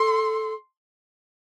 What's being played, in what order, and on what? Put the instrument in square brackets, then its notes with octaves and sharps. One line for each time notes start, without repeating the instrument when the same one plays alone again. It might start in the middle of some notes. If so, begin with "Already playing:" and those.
Already playing: [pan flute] A4 [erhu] C6